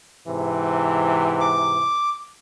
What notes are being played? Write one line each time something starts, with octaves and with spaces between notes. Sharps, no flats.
G#2 C3 E3
D6